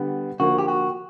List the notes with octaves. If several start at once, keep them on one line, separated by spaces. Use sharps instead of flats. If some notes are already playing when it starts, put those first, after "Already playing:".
Already playing: D3 G3 B3
D3 F3 A#3 F#4
G4
F#4